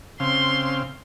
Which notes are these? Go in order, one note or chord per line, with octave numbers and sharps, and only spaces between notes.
C#3 C4 F5 C6